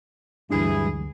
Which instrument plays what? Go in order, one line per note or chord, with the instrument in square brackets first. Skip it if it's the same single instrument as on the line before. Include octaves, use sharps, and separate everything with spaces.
[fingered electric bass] D2 D4 [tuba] G2 [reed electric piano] E3 F#3 G#3 [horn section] E4 G#4